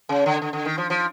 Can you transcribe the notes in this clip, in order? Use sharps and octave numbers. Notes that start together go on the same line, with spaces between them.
C#3
D3
D3
D3
D#3
F3
F3